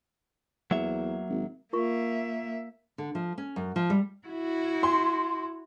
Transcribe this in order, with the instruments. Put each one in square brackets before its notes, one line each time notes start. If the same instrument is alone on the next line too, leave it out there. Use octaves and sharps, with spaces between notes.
[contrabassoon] E2 [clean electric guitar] F#3 A#3 E5
[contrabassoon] G#1
[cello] A#3 E5 [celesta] F4 A#4 C#6
[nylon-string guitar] D3
F3
C#4
F#2
F3
G3
[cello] E4 F#4
[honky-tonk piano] C6